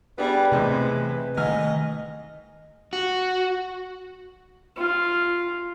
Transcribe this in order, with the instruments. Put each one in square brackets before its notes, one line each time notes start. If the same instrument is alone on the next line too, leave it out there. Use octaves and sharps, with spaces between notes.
[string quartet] G3 [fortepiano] B3 D4 G#4 [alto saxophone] B4
[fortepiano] E2 A2 C5 [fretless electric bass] C3 [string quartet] E3 G#3
[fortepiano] C2 G#5 F6 [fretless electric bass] D#3 A3 [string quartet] D#5
[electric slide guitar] F#4
[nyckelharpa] F4